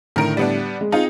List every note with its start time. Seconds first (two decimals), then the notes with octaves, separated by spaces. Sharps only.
0.16 A2 D3 D#3 A#4 D7
0.37 G3 B3 D4
0.81 G#3
0.92 C4 D#4 F4 G#4